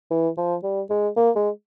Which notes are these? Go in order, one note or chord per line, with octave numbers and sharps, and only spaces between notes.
E3
F3
G3
G#3
A#3
G#3